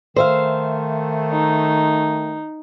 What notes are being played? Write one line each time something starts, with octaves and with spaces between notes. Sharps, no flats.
D#3 A3 C5 E5 F5
D#4